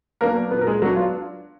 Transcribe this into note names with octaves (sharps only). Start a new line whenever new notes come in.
F#3 A#3 B3 D4 A#4
A#2 B3 B4
A#4
G#3 G#4
F#3 B3 D4 F#4
F4